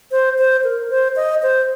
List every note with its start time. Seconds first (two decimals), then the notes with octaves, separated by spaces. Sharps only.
0.11 C5
0.38 C5
0.64 A#4
0.90 C5
1.16 D#5
1.42 C5